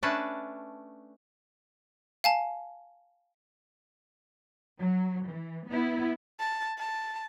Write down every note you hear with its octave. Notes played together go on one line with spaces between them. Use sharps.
A3 C#4 D4 B4 A5
F5 G#5 A5
F#3
E3
B3 E4
A5
A5